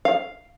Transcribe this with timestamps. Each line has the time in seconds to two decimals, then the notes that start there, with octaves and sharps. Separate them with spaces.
0.05 F5